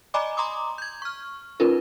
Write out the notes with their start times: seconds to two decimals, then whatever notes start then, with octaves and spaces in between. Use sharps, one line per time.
0.14 D5 D#5 G#5 A#5 B5 D6
0.37 A#5 C6 D6 D#6
0.78 G6 G#6
1.02 C#6 F6
1.60 C#4 D#4 F4 A#4 B4